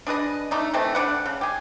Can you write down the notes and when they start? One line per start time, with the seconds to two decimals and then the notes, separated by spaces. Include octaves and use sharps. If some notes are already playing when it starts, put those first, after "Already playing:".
0.07 D4 G#4 B4 D#5
0.51 A3 D4 D#4 A#5
0.74 E3 A3 C4 A4
0.95 D3 D4 B4 F#5
1.26 C#3
1.41 G4 G#4